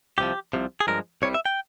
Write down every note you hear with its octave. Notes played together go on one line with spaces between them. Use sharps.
C2 C3 F3 G4
C2 C3 F3
G#4
G2 F3 G#3 A#4
C2 C3 G3 C#5
E5
G5